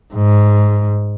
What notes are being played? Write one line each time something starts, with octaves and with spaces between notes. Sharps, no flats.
G#2